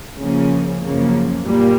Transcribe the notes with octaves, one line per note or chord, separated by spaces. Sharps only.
C#3 F3 A#3 C#4
F#2 C#3 F3 A#3
A#2 G3 A#3